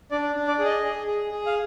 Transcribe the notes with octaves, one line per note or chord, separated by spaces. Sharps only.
D4 D5
D4
D5
G#4
D#5
G#4
G#4
G#4
F5